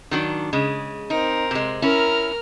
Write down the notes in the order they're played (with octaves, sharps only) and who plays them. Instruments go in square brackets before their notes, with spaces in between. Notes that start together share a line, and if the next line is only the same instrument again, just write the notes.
[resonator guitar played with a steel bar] D#3 F#3 D4
C#3 G#3
[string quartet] C4 A#4 [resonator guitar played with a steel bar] D#4
[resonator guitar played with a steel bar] C3 G#3
[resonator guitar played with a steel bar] C#4 E4 [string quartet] A#4 A#5 F6